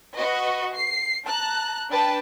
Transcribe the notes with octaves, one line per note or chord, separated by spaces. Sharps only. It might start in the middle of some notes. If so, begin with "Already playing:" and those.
F#4 B4 D#5
C7
A5 A#5 F#6
D4 B4 G5 A5